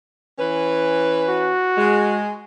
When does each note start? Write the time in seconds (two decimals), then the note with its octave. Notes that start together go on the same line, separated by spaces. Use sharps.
0.39 E3 C#4 B4
1.29 F#4
1.78 G#3